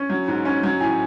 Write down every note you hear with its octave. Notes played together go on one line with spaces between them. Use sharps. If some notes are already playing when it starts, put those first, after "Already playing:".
Already playing: C#4
F#3
G#2
C#4
F#3
A2 G#5